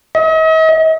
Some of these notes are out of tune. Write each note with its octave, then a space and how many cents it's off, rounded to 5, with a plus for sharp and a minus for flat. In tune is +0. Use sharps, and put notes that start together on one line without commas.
D#5 +45